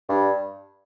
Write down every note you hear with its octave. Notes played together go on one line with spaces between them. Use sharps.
G2